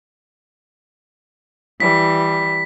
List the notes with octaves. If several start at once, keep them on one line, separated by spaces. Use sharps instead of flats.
E3 G3 B6